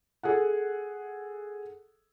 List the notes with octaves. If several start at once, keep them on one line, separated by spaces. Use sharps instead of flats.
G#4 A4 F#5